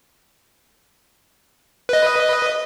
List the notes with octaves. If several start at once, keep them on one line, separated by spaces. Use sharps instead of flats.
B4 D#5